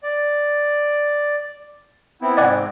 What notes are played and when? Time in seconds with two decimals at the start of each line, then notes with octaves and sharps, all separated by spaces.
0.03 D5
2.22 B3 C4 E4
2.37 G#2 C4 D5 F#5 G#5